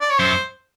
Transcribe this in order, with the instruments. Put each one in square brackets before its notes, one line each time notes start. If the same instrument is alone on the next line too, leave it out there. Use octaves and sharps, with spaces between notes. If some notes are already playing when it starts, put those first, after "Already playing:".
[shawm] D5
C#5
[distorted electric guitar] F#2 [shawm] C5